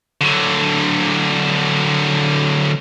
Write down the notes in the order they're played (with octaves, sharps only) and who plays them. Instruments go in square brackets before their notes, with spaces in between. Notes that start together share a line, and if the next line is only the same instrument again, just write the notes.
[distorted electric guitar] D3 F#3